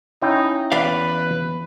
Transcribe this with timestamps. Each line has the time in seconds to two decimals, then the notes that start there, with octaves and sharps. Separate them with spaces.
0.22 C#4 D#4 E4 G5
0.72 E2 B4 D5 F5